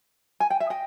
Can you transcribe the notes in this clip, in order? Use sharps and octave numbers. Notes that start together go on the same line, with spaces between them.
G#5
G5
E5
D#5 G5